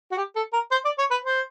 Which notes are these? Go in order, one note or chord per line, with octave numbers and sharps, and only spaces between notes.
F#4
G4
A4
A#4
C5
D5
C#5
B4
C5